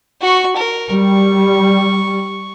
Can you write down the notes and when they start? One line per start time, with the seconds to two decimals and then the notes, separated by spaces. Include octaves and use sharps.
0.21 F#4 C#6
0.56 A#4
0.92 G3 C#6